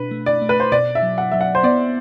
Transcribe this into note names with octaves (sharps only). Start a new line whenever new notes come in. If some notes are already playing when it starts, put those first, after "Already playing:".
Already playing: B2 D4 B4
A3
D5
A3
B4
C5
B2 D5
E5
F#3
F#5
F#3 E5
F#5
C5
B3 D5